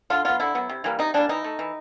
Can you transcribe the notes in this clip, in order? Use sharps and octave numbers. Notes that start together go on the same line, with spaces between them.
D3 F4
F#3 B3 F4
D3 E4
F#3 B3
C3
E3 G3 A#3
C3 D#4
E3 G3 A#3 D4
E3 D#4
A3
E3